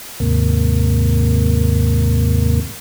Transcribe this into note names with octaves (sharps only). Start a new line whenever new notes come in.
D#2 G#2 C3 A#3